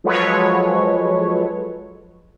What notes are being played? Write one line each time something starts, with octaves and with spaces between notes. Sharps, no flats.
F3 F#3 G#3 A4 B4 C#5